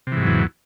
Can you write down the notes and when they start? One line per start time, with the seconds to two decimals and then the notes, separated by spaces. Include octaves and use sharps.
0.07 C3
0.12 E3
0.17 G#2
0.22 F#3
0.27 E2